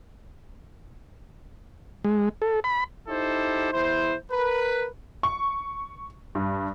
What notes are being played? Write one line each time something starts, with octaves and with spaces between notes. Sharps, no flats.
G#3
A4
B5
D#4 E4 G4 A4 C5
E2 E4 C5
A#4 B4
C#6
G2